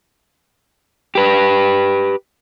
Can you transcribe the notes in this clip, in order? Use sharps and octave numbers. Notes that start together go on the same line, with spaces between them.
G4 B4